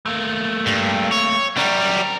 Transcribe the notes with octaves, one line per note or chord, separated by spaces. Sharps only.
A3 A#3
G2
C#5
F#2 G3 C4 A#4